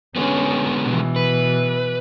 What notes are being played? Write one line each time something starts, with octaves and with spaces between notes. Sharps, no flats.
D3 G#3 B3 C#4
B2 E3
B4